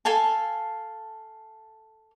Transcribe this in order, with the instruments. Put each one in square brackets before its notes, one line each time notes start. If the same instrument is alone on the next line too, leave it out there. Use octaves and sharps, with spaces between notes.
[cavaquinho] A4 F5 G#5 A5